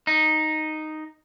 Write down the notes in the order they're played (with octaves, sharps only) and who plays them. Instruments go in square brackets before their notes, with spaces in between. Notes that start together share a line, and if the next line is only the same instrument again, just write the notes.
[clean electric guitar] D#4